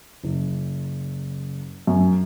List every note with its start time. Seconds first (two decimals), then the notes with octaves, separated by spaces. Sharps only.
0.23 F#1
1.87 F#2